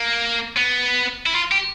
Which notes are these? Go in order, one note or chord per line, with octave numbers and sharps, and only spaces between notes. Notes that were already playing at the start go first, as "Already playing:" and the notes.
Already playing: A#3
B3
E4
F4
G4